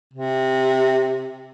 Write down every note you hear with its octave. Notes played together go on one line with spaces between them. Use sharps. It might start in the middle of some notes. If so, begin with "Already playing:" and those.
C3